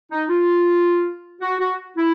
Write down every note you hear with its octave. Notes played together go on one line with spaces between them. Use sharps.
D#4
F4
F#4
F#4
E4